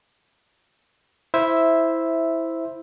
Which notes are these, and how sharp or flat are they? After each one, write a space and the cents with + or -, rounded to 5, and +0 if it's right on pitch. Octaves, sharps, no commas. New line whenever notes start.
E4 -5 C5 +0 E5 +0